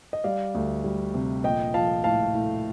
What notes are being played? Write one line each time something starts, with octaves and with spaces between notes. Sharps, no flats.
D#5
G3 D5 F5
D2
G3
C3
A#1 D#5 G5
F3 F5 A5
A2 F5 A5
A2